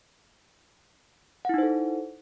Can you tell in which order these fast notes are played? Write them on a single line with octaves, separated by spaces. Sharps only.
F#5 E4 D#4 C5 A4